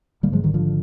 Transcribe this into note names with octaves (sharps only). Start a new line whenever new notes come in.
G#1 G2 D3 G3 A#3
F3 G#3
D#3 G3
D3 F3